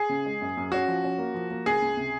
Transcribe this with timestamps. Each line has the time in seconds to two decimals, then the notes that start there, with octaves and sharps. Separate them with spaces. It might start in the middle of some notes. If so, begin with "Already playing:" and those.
Already playing: G#4
0.09 C#3
0.26 G#3
0.41 F#2
0.57 F#2
0.72 C#4 F#4
0.88 F3
1.03 C#4
1.19 A#3
1.34 F3
1.51 A#3
1.66 C#2 G#4
1.82 C#2
1.97 C3